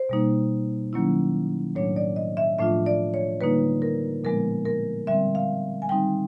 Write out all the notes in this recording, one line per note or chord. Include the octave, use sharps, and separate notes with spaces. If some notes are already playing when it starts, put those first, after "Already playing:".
Already playing: C5
B2 G3 A#3 D#4
D#3 F#3 A#3 C#4 E4
A2 F#3 A3 D4 C#5
D5
D#5
E5
A2 F3 A3 D4 F4 E5
D5
C#5
D3 G3 A#3 D#4 B4
A#4
A#2 F3 G#3 B3 A#4
A#4
D3 G3 C4 E5
F5
G#5
D#3 G3 C4 D#4 G5